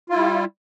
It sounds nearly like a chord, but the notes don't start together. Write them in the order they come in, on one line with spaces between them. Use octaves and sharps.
F4 E4 G3